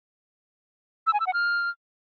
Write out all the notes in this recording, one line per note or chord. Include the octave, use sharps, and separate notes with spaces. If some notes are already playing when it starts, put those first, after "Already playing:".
E6
G#5
E6
F#5
F6